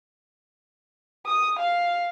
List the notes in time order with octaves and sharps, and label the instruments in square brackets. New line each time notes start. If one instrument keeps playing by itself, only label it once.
[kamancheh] D#6
F5